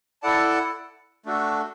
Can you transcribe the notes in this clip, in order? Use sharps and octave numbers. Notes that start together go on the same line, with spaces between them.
E4 A4 D5 F#5 A5
A3 D4 F#4 A4